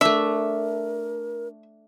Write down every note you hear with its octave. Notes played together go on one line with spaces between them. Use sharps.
A3 D4 A#4 E5